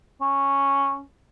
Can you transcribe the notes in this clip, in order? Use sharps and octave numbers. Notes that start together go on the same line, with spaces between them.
C#4